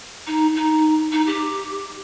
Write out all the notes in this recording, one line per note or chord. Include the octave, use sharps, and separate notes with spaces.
D#4
D#4
D#4
G4